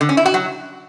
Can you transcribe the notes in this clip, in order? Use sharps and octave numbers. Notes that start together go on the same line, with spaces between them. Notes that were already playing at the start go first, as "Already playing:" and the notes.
D3
C#4
E4
F#4
F#3